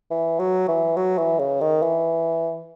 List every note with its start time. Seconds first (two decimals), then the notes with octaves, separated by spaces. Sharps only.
0.11 E3
0.39 F#3
0.68 E3
0.96 F#3
1.18 E3
1.39 C#3
1.61 D#3
1.82 E3